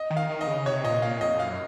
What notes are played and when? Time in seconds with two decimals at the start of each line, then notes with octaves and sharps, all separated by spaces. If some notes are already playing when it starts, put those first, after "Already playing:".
Already playing: D#5
0.10 D#3
0.17 F5
0.29 D#3
0.41 D#5
0.47 C#3
0.66 C3 C#5
0.84 A#2 D#5
1.02 A#2 F5
1.21 F2 D#5
1.39 F#2 F5